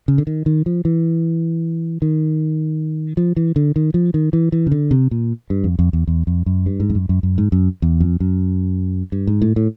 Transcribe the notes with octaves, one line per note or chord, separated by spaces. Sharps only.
C#3
D3
D#3
D#3
F3
E3
D#3
F3
E3
D3
D#3
F3
D#3
E3
E3
C#3
D3
C3
A#2
G2
F2
F2
E2
E2
F2
F#2
G2
G#2
F2
F#2
F#2
F#2
G#2
F#2
E2
F2
F#2
G2
G#2
A2
A2